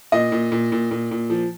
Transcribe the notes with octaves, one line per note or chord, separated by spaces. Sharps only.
A#2 D#5
A#2
A#2
A#2
A#2
A#2
F3